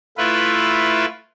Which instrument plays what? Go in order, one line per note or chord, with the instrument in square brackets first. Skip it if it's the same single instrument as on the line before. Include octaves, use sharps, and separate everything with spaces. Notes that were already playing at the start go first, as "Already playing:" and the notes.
[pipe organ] A3 E4 F4 B4